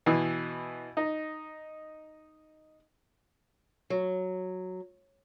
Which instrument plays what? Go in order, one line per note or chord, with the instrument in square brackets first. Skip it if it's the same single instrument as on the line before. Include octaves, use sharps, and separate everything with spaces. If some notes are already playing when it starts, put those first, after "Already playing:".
[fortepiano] B2 E3
D#4
[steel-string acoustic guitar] F#3